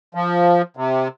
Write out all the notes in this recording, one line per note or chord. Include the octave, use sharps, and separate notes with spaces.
F3
C3